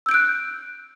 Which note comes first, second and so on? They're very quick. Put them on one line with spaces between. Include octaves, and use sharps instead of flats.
E6 G6 D7 F#6